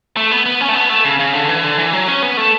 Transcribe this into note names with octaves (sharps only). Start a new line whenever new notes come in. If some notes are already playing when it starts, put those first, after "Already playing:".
A3
B3
B3
C#4
A3
B3
A3
C#3
C#3
D3
E3
D3
E3
F#3
C#4
B3
A3